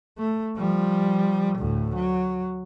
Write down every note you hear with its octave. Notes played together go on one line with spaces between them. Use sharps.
A3
F3 G3
D2 A2
F#3